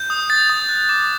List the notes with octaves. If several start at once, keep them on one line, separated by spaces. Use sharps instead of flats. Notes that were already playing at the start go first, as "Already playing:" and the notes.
Already playing: G6
D#6
G6 A6
D#6
F#6
D6